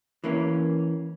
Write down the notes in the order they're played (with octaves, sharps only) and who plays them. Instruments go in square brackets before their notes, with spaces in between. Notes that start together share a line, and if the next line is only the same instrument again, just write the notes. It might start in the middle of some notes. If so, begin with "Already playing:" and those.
[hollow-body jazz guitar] E3 A#3 C#4